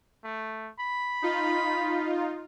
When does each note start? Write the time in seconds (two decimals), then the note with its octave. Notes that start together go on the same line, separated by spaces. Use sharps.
0.24 A3
0.79 B5
1.22 D#4 F4